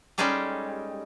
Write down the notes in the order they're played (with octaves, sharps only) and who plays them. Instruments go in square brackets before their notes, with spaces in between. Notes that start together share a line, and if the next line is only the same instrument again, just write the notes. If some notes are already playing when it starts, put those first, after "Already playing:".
[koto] G3 G#3 C#4 D#4 G#4 A4